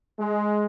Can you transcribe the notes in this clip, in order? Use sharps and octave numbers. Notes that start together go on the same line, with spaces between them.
G#3